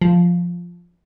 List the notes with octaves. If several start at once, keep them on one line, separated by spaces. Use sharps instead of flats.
F3